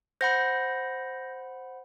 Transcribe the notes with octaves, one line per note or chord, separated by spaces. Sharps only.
C5 F#5 B5 G6 A#6